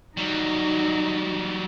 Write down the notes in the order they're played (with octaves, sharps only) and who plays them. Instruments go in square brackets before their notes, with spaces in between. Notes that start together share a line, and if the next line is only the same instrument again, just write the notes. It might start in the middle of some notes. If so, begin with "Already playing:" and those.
[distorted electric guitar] F#3 G3 [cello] D#4